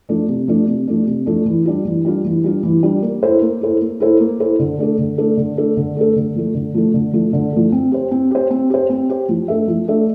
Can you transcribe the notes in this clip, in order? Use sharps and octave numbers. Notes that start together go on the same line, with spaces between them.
F3 A3 D4
C3
F3 A3 D4
C3
F3 A3 D4
C3
F3 A3 D4
E3
G3 D4 F4
E3
G3 D4 F4
E3
G3 D4 F4
E3
G3 D4 F4
A#3
E4 A4 C5
A#3
E4 A4 C5
A#3
E4 A4 C5
A#3
E4 A4 C5
D3
A3 D4 A4
D3
A3 D4 A4
D3
A3 D4 A4
D3
A3 D4 A4
D3
F3 A3
D3
F3 A3
D3
F3 A3
D3
F3 A3
C4
G4 C5
C4
G4 C5
C4
G4 C5
C4
G4 C5
F3
A3 D4 A4 E5
F3
A3 D4 A4 E5